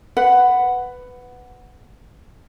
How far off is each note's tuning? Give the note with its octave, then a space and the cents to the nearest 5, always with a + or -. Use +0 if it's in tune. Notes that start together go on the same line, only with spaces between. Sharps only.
B4 +10 F#5 +0